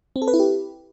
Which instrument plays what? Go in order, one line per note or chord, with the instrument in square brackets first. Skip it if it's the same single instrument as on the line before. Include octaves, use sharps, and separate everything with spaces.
[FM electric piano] C4
A4
B4
E4
G4